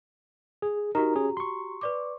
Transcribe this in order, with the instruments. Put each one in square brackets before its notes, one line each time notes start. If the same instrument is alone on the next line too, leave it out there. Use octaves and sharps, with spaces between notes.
[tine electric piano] G#4
[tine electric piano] D#4 A#4 [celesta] F#4 G4 A#5
[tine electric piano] C#4 G#4
C6 C#6
[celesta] B4 D5 D6